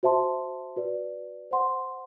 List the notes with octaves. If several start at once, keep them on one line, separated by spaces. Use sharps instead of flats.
F#4 C5 E5 A5 C6
F#4 B4 D5
C5 F#5 C6